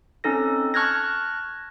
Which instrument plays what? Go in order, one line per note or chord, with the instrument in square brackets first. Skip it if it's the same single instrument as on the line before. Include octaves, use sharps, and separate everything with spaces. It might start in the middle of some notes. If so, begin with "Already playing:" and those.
[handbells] C4 C#4 D#4 A4 A#6
A5 C#6 F6 F#6 G#6 A#6